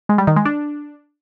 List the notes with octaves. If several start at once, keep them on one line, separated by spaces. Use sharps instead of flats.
G#3
G3
D#3
G#3
D4